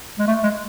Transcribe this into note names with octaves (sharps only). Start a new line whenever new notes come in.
G#3
A3
G#3